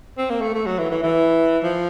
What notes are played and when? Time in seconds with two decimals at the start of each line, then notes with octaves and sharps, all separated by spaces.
0.18 C4
0.30 A#3
0.42 A3
0.54 A3
0.66 F#3
0.79 E3
0.91 E3
1.03 E3
1.64 F3